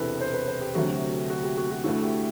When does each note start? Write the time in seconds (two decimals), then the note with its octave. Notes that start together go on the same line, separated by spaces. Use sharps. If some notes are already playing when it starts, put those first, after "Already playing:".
Already playing: E1 E2 C3 E3 A4 B4
0.21 C5
0.34 B4
0.48 C5
0.61 G4
0.75 D2 C3 F#3 A3 F#4
1.30 F#4
1.43 G4
1.58 F#4
1.71 F#4
1.84 D2 D3 A3 E4 F#4
2.02 G4